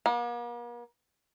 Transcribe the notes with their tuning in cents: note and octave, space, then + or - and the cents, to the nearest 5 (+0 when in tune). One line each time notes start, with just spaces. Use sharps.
A#3 +45